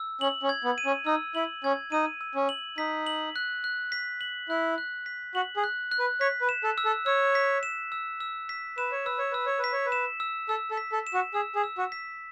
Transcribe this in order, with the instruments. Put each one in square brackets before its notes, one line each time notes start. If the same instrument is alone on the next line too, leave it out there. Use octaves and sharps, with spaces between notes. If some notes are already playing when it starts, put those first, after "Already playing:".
Already playing: [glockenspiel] E6
[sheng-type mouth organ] C#4 [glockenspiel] F#7
[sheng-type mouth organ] C#4
[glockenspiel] G#6
[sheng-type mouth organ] B3
[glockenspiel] D#7
[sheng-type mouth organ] C#4
[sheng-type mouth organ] D#4 [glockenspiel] E6
[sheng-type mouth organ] E4 [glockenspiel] F#7
[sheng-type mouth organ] C#4 [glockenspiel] G#6
[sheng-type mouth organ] D#4 [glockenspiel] D#7
[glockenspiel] E6
[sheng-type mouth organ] C#4
[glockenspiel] F#7
[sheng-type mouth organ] D#4 [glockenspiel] B6
[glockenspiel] F#7
F#6
F#6
B6
F#7
[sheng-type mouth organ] E4 [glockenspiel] F#6
[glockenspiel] F#6
B6
[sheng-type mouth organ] F#4 [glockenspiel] F#7
[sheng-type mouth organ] G#4
[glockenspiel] F#6
F#6
[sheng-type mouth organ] B4
[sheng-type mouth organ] C#5 [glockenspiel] B6
[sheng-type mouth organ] B4
[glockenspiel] E7
[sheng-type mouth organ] A4
[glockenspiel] E6
[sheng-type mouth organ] A4
[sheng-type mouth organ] C#5 [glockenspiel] E6
[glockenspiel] B6
E7
E6
E6
B6
[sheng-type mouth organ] B4 [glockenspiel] E7
[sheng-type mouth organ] C#5
[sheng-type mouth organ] B4 [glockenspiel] E6
[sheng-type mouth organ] C#5
[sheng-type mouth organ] B4 [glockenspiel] E6
[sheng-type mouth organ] C#5
B4
[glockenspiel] B6
[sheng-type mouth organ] C#5
B4
[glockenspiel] E7
E6
[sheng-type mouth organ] A4 [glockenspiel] E6
[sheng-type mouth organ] A4
[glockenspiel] B6
[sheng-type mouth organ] A4
[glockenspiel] E7
[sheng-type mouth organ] F#4
[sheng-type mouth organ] G#4 [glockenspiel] E6
[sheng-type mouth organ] G#4
[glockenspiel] E6
[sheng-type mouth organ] F#4
[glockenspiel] B6